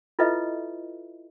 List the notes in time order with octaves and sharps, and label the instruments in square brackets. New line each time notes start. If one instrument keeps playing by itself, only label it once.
[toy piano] E4 F4 A4 B4 D#5 E5